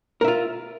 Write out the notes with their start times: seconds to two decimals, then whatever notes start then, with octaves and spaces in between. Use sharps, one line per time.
0.21 A#4
0.24 E5
0.28 F4